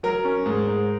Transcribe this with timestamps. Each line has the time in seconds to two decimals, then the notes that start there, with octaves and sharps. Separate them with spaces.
0.03 F#3 A#4
0.25 C#4
0.46 G#2
0.68 G#2